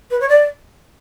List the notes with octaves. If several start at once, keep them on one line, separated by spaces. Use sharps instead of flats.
B4
C#5
D5